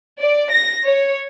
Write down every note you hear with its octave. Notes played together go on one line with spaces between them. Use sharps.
D5
A#6
C#5